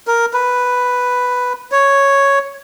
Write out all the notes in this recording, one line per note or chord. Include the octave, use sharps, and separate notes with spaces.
A#4
B4
C#5